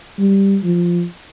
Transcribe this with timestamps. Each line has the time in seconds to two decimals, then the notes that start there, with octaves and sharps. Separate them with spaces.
0.19 G3
0.64 F3